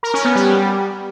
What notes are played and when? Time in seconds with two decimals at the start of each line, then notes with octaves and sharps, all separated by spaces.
0.03 A#4
0.14 C#4
0.25 B3
0.35 G3